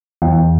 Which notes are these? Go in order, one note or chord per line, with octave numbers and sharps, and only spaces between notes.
E2